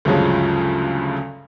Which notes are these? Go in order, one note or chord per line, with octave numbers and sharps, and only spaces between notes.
D2 G2 C#3 F3 F#3 G#3